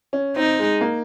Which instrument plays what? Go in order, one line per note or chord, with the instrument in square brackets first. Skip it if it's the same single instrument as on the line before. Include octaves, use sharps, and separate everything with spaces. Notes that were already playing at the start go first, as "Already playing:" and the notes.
[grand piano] C#4
[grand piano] C4 [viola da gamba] D#4
[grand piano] G#3
A#3